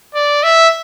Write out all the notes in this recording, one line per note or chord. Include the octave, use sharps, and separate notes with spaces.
D5
E5